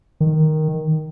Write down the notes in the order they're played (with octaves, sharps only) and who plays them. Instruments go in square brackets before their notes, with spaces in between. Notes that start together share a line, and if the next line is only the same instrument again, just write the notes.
[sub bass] D#3